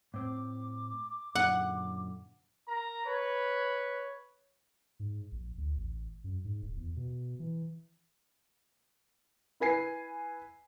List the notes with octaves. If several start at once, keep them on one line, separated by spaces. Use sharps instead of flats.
A2 C4 D6
F#2 A#2 D3 F#5
A#4 A#5
B4 C#5
G#2
A#1
D2
A1
F#2
G#2
D#1
E2
B2
E3
E4 B4 G#5 C7